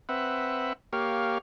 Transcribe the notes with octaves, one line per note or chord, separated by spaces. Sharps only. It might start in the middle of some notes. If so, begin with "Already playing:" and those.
C4 B4 E5 F#5
A#3 G4 C#5 F5